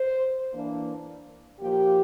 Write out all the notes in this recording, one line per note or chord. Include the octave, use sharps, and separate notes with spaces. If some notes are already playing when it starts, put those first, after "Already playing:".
Already playing: C5
E3 A#3 D4
A#2 F3 A#3 G4